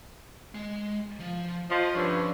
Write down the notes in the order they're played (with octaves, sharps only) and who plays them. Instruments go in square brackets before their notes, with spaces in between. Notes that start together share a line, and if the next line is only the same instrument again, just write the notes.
[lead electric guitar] G#3
F3
[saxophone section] F3 [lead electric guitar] D#5
[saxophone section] G2 D3 C#4 [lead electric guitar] F3